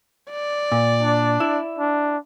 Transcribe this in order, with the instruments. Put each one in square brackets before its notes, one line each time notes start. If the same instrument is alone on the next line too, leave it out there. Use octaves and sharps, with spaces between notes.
[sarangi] D5
[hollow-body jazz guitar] A#2
[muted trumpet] D4
[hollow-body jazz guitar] E4
[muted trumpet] D4